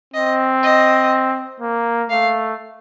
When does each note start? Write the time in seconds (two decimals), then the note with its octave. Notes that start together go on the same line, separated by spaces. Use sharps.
0.14 C4 D#5
0.63 D#5
1.60 A#3
2.09 A3 F5